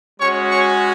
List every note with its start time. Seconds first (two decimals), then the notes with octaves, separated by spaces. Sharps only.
0.20 G#3 C#4 F#4 C#5 C#6
0.51 C#5 C#6